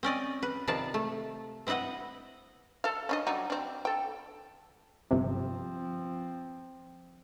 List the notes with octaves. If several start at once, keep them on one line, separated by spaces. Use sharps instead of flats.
C4 C#4 D5 D#5
B4
C3 D#3 F3 D5 F5 A5
A3
C4 E4 B4 D#5 F#5
A4 F5
C#4 D4 D#5
F#3 G3 D#4
C4 D4
A4 G5
G1 C3 F3 C4